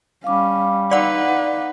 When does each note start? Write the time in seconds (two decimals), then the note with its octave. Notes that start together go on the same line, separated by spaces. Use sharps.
0.24 G3 C#4 F5 D6
0.91 D#4 B4 D5 F#5